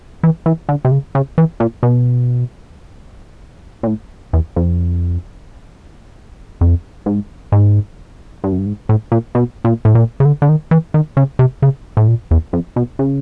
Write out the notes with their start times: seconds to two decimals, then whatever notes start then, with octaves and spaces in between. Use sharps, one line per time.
0.23 E3
0.46 E3
0.69 D3
0.85 C3
0.91 C#3
1.15 C#3
1.38 E3
1.60 A#2
1.83 B2
3.83 A#2
3.87 A2
4.33 E2
4.56 F2
6.61 F2
7.06 G#2
7.52 G#2
8.44 G2
8.52 F#2
8.58 G2
8.66 G#2
8.89 A2
9.12 A#2
9.35 B2
9.65 A#2
9.85 A2
9.95 A#2
10.20 C#3
10.25 D3
10.42 D3
10.49 D#3
10.71 E3
10.94 D#3
11.17 C#3
11.39 C3
11.62 C#3
11.97 A2
12.08 A#2
12.31 E2
12.53 F2
12.76 B2
12.99 C#3